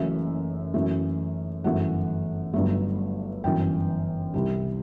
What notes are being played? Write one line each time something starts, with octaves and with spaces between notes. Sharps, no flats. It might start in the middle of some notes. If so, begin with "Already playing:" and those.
Already playing: F#1 F#2 E3 A3 E5
F#2 E3 A3
G1 F#2 E3 A3 F#5
G1 G2 F#3 A3
G1 F#2 E3 G5
C2 C3 G3